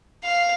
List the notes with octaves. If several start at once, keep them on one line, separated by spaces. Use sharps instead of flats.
F5